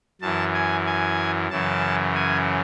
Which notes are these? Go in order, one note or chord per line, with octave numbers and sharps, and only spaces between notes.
F#2 E3 A5
G#5
G#5
F#2 C#3 E3 A5
G#5